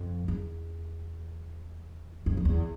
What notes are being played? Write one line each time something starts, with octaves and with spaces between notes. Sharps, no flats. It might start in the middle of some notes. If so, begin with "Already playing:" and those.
Already playing: F2
E2
F2
F2
E2